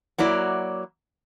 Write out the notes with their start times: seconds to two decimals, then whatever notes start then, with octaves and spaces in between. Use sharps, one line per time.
0.18 F#3 A#3 E4 D5